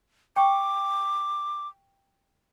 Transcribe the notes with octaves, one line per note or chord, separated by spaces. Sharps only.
G5 C#6 D6